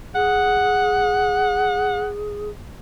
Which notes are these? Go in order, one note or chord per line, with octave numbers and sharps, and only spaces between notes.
G#4 F#5